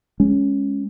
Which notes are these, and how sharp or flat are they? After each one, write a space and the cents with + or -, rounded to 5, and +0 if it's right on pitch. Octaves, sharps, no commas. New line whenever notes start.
G#3 +0 C#4 +0